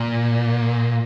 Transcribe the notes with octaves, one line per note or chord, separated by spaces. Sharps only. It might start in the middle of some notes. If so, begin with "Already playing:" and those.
Already playing: A#2